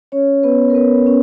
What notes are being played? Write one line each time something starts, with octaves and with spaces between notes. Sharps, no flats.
C#4 C#5
B3 B4
A#4
B3 B4
C#4